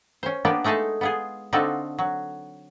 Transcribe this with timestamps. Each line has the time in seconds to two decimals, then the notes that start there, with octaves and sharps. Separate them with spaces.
0.23 C#4 C5
0.45 A#3 B3 D4 F4 G4 B4
0.64 G#3 A3 D#4 G#4 A4
1.01 B3 F4 G#4
1.53 D3 C4 D#4 F4 F#4 A4
1.99 F#3